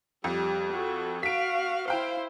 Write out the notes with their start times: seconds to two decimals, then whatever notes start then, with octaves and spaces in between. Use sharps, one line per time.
0.24 F2 G3
0.72 F#4 A4
1.23 F#4 F5 B6 D7
1.88 E4 C5 F5 G5